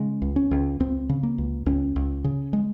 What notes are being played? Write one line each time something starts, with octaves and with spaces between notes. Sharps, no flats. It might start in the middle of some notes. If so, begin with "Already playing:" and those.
Already playing: C#3 G#3
C#2
C#4
C#2
C#2 C4
C#3
A#3
C#2
C#2 C#4
C#2
C#3
G#3